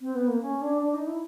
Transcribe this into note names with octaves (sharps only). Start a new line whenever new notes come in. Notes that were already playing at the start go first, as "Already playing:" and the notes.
C4
B3
A#3
C#4
D4
D4
D#4
E4